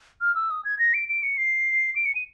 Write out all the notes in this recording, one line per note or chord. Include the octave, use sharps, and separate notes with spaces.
F6
E6
D#6
G#6
A#6
D7
D7
C#7
C7
D7
C#7
D#7